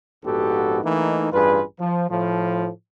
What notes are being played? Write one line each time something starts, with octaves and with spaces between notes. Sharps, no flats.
A#1 G#2 B3 F#4 G4 A4
E3 A3 A#3 D#4
A1 G2 F4 G#4 B4
F3
A2 F3